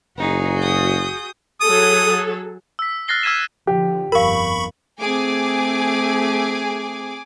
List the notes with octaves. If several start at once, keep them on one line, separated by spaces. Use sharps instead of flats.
F#1 D#4 F#4 G#4
D#6 G6
F#3 G#4 A4 D#6
E6 B6
F6 F#6 A6 A#6 C7 G7
E6 F6 G#6 B6 D#7 E7
D3 F3 G4
G1 F2 A#4 F5 B5 C#6
A3 C4 G#4 G#5 D6